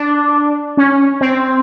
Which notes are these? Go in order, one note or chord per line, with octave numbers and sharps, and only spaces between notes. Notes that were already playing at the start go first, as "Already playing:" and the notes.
Already playing: D4
C#4
C4